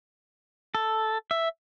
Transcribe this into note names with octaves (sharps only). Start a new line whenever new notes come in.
A4
E5